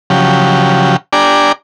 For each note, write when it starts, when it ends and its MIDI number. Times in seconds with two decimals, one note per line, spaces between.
0.10 0.96 49
0.10 0.96 53
0.10 0.96 54
0.10 0.96 67
1.13 1.52 62
1.13 1.52 67
1.13 1.52 74
1.13 1.52 80
1.13 1.52 82